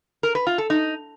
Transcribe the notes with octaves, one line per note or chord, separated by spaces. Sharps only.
A#4
B4
F4
A4
D#4